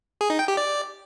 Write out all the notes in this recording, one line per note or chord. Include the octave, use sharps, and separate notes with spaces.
G#4
D#4
G5
G4
D5